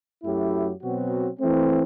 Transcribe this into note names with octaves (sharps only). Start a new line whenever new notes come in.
F#2 F#3 A3 E4 G4
B2 F#3 C4 F#4
E3 A3 C4